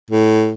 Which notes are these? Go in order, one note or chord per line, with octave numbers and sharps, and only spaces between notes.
A2